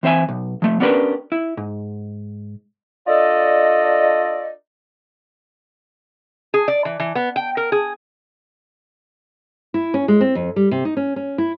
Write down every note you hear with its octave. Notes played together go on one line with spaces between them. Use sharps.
E3 C4 C5 E5 G#5
B1
F3 A3
B3 C#4 D4 G4 A#4 B4
E4
G#2
D4 F4 A4 D5 D#5
G#4
D5
E3
E3
B3
G5
A#4
G#4
E4
C#4
G#3
C4
F2
G3
C3
D#4
C#4
C#4
E4